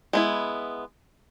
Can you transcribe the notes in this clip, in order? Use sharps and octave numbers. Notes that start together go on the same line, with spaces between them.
G#3 B3 E4